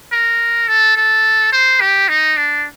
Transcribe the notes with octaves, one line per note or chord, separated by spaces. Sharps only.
A#4
A4
A4
C5
G4
D#4
D4